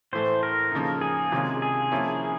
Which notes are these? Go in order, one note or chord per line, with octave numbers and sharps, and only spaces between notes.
A2 E3 A3 C5
A#4
C#3 F3 A#3 D#4
G#4
C3 D#3 G#3 C#4 F4
G#4
F3 A#3 C#4 E4